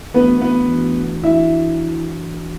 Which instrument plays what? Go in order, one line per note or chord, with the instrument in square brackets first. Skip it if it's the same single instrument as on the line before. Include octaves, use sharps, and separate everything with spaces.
[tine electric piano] E3 A3 D4 F#4 [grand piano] B3 B4
[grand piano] B3 B4
[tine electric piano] E3 A3 D4 F#4
[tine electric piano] E3 D4 F#4 [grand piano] E4 E5